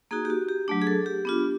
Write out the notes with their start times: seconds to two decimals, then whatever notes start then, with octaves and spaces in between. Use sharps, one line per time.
0.11 A#3 D#4 F#4 G#4
0.25 G4
0.30 F#4
0.49 G4
0.68 F#3 A3 D4
0.82 G#4
0.87 A4
1.06 G4
1.25 B3 D4 F4